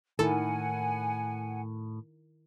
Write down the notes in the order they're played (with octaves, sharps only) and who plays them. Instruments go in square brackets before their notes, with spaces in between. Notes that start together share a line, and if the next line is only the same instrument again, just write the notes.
[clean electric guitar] A2 [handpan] D#3 E4 A#4 [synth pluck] A4 [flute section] F#5 G#5